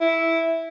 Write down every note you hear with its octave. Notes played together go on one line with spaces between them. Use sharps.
E4